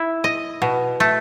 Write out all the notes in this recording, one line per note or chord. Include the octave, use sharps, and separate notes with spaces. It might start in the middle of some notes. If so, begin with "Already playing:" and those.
Already playing: E4
D#5
B2
A3